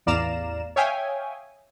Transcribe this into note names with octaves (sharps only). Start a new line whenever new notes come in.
A1 E2 D5 F5 A#5 E7
C#5 E5 F5 G5 G#5 D#6